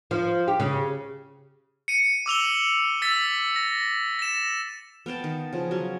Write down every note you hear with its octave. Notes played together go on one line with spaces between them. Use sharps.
F3
G4
C#3
C#7 D#7
D6 E6 F7 G7
E6 A6 B6
A#6
A#6 E7
B3 F5 G5 A5
D#3
C#3 F3
F#3 C#4